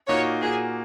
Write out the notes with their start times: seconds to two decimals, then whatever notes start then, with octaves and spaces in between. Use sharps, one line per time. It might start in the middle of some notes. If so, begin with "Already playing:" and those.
0.08 A#2 A#3 D#4 F#4 C#5
0.42 A#2 A#3 F#4 G#4